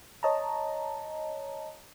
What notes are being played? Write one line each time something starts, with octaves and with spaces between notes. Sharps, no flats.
C#5 D#5 A5 A#5